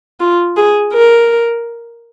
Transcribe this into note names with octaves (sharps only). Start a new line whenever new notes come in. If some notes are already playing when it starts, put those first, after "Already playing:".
F4
G#4
A#4